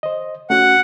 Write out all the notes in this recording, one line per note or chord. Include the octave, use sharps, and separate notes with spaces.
C5 D#5
A3 C#4 F#4 F#5